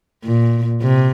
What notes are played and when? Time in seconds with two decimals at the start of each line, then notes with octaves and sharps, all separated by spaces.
0.24 A#2
0.82 C3